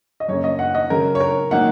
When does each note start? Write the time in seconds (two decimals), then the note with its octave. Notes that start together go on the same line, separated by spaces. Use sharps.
0.20 D#5
0.28 F#2 C#3 A#3 C#4 C#5
0.44 D#5
0.59 F#5
0.75 D#5
0.90 C#3 F#3 C#4 A#4
1.15 C#5
1.20 A#4
1.51 D#3 F#3 A#3 D#4 F#5